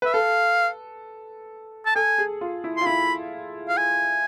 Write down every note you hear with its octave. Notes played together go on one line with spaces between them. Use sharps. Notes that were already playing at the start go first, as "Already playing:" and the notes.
B4 E5
A4 F5
A5
A4 G#5
G#4
F4
E4
F4 C6
E4 B5
F5
G#5